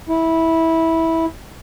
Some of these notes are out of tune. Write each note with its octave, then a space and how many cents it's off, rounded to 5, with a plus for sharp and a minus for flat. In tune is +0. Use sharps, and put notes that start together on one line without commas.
E4 -15